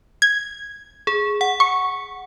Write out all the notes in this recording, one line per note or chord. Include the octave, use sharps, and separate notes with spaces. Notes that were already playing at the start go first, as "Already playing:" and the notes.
G#6
G#4
F#5
C#6